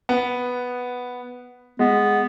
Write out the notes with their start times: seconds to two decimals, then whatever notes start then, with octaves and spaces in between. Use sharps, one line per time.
0.09 B3
1.79 G#3 B3